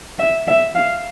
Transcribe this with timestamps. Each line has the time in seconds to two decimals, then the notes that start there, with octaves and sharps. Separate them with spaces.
0.19 E5
0.47 E5
0.75 F5